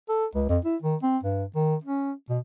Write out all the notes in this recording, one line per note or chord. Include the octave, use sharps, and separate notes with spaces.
A4
C#2
F2
E4
D#3
C4
G2
D#3
C#4
B2